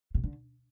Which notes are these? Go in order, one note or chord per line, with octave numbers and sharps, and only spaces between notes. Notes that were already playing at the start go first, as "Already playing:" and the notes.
C3
D3